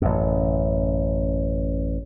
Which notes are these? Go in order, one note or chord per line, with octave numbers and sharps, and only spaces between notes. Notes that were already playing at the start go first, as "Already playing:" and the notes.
A1 F#2